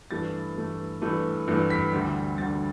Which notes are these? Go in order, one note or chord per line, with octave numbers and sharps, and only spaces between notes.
G2 E3 A3 A6
G2 E3 A3
G2 E3 A3
G2 E3 A3
B6
D2 D3 G3
D2 D3 G3 A6